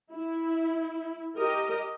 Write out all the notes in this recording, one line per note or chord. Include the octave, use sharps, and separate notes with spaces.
E4
G4 A#4 D#5